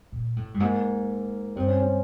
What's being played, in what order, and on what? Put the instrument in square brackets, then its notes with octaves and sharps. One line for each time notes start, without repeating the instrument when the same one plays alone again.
[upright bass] A#2
A2
G2
[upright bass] G#2 [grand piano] A#3
[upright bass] G2 [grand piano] C4
[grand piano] C#4
C#4